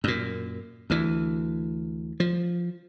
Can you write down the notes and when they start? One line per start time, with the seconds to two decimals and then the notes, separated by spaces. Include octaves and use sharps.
0.04 F#2 A#2
0.90 D2 E3
2.20 F3